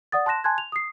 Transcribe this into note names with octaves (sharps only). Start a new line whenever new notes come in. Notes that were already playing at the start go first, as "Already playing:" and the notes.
D5 F#5 D#6 A6
A5 C6 F#6 A#6 E7
G#5 A5 C6 F#6 G#6
F7
D#6 C7